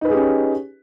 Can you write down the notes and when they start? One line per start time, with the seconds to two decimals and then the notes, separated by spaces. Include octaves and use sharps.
0.01 D#4
0.05 B4
0.08 G#4
0.11 G4
0.15 C#4